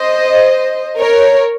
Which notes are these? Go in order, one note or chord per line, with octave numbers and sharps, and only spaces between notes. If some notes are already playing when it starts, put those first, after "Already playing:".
Already playing: C5 D#5
A#4 C#5